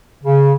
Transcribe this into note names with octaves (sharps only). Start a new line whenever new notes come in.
C#3